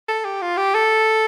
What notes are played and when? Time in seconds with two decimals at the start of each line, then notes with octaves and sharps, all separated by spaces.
0.09 A4
0.25 G4
0.41 F4
0.57 G4
0.75 A4